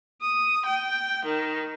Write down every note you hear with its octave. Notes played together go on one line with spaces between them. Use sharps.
D#6
G5
D#3